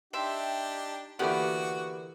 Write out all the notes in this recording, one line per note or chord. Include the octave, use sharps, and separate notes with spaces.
D4 D#4 G4 E5 G5 C6
D3 E3 A#3 B3 D4 F#4 G4 F#5